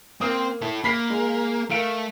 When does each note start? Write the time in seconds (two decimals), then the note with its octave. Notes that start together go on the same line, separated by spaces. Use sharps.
0.21 A#3 C4 D#6
0.62 E4 A4
0.84 A#3 B5 B6 C7
1.10 G#3
1.70 A3 A#4 F5 D7